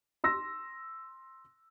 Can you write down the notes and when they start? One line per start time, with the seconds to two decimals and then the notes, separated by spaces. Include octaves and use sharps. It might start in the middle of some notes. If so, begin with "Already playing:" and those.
0.24 C6 E6 A#6